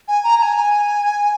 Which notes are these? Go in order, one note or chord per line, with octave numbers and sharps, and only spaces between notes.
G#5
A#5
A#5
G#5